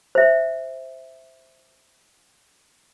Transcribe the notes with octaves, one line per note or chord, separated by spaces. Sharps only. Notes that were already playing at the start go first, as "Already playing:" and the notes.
C5 E5